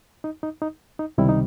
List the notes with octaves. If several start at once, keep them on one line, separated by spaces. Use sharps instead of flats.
D#4
D#4
D#4
D#4
C#2 C3 D#3 G3 E4
D#4